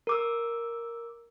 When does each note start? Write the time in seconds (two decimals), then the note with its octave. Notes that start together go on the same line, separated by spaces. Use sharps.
0.07 A#4 D6 E6